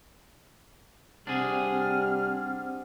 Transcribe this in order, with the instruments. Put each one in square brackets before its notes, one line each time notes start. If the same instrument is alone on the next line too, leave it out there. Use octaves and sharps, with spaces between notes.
[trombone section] C3 G3 [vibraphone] C4 C5 F#5 [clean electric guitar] D4 G#4 [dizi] F6